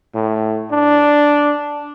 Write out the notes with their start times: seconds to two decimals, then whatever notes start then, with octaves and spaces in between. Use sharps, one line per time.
0.15 A2
0.71 D4